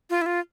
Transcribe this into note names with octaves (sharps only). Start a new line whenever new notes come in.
F4
E4
F4